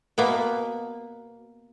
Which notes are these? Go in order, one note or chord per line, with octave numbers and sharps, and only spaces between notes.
B2 A#3 B3